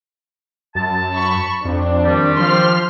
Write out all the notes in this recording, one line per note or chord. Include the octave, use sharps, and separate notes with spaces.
F#2 A5
B5 C#6
F2 C4 D4
D#3 G3
F3 C5 C6 F6